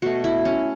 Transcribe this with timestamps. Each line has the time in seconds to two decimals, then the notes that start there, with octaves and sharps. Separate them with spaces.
0.02 B2 A3 F#4
0.24 E4
0.45 C#4